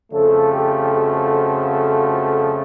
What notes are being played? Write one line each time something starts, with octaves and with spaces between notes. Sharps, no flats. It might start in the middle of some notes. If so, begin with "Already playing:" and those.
F2 C#3 F3 A3 A4
G4
F#4